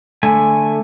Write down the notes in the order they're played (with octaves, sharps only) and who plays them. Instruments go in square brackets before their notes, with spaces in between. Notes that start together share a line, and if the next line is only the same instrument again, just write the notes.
[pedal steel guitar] D3 A3 G#5